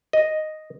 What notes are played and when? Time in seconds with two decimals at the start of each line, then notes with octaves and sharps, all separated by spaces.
0.13 D#5